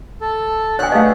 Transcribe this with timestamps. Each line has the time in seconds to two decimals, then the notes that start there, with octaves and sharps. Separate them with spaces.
0.21 A4
0.79 B2 D3 C#5 G#5 F#6
0.92 A3 F4 G4 G#4 D#5 F5